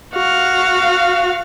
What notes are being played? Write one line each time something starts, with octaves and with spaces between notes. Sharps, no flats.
F#4 F5